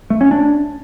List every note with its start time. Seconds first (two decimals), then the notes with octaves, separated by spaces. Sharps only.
0.10 A3
0.21 C#4
0.31 D4